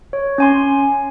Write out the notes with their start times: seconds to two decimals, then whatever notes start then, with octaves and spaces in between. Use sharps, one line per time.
0.13 C#5
0.38 C#4 G#5 C6